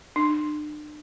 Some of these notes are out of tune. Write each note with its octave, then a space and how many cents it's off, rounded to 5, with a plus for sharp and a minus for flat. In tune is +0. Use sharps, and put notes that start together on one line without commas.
D4 +40